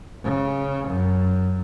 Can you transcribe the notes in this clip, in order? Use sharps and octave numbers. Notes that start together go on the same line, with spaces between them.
C#3
F#2